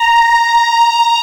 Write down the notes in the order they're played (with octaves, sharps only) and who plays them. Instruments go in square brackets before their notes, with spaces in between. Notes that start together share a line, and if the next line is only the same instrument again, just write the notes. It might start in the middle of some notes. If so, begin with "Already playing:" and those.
Already playing: [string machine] A#5